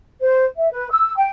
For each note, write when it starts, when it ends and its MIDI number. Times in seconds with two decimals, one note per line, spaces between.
0.21 0.45 72
0.56 0.69 76
0.70 0.89 71
0.90 1.15 88
1.16 1.31 79